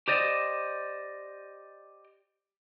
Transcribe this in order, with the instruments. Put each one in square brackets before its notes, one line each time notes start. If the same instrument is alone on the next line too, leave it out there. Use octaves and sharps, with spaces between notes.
[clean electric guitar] G4 C5 D5 D#5